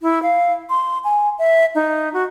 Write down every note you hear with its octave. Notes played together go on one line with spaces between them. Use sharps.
E4
F5
C6
G#5
E5
D#4
F#4